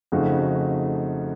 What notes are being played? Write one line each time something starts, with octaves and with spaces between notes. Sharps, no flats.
F2 C#3 A3 D#4 F#4